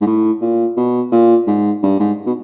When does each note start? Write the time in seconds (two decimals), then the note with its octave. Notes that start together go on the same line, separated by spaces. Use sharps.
0.01 G#2
0.06 A2
0.41 A#2
0.77 B2
1.12 A#2
1.47 G#2
1.83 G2
2.00 G#2
2.26 B2